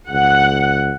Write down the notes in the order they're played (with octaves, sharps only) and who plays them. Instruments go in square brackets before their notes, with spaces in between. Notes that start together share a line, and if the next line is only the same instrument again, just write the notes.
[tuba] C#2 [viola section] F#5